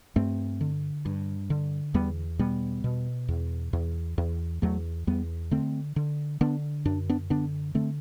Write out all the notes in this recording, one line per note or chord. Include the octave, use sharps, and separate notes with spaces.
G2 A3 C4
D3
G2
D3
E2 G3 B3
B2 G3 B3
B2
E2
E2
E2
E2 F#3 A3
E2 G3 B3
D3 A3 C4
D3
D3 B3 D4
F#2 D4
B3 D4
D3 B3 D4
D3 A3 C4